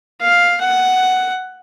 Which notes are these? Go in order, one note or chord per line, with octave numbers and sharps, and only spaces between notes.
F5
F#5